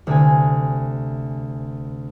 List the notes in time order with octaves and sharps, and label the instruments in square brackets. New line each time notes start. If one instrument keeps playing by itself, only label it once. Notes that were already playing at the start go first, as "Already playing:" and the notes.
[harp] D2 C3 G#5